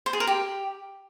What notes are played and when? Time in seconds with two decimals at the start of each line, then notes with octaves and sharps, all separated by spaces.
0.06 C5
0.13 G#4
0.20 A#4
0.27 G4